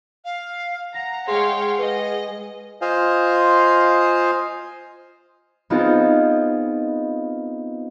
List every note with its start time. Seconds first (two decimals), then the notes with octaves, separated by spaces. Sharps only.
0.25 F5
0.94 F#5 A#5 A#6
1.27 G#3 G#4 C#5 F5 G5 C6
1.79 B4 D#5
2.81 F4 C5 D#5 F5 G#5
5.70 B3 C4 D#4 F4 G#4 C5